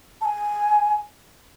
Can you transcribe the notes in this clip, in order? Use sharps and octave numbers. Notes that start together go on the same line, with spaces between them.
A5
G#5